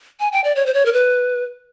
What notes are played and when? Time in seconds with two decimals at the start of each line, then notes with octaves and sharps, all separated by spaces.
0.20 G#5
0.32 G5
0.44 D5
0.56 C#5
0.66 C5
0.74 C#5
0.86 A#4
0.93 B4